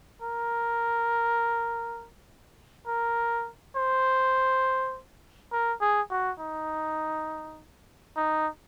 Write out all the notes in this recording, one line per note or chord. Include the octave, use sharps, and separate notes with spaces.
A#4
A#4
C5
A#4
G#4
F#4
D#4
D#4